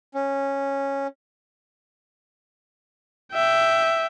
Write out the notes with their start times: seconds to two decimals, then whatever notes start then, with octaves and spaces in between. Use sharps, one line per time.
0.14 C#4
3.33 E5 G5